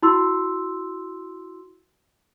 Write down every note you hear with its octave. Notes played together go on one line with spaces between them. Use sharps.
E4 F#4 C6 E6